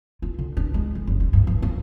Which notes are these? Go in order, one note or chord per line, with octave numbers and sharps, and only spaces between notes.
F4
D3
D4
G#3
D3
F#1
D3
G2
F3
A#3